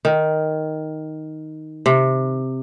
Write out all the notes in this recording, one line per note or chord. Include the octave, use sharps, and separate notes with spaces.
D#3
C3